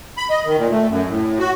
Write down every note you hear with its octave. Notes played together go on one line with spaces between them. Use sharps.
B5
D#5
D#3
A#2
A3
F#2
A2
F#4